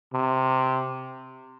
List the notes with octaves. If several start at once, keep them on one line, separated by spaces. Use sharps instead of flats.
C3